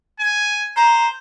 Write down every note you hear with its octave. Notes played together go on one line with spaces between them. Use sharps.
G#5
C5 A#5